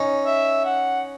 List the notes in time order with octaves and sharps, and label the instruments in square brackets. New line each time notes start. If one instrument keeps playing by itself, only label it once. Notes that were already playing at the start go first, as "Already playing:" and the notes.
Already playing: [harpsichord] C#4 D#4
[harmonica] E5
F#5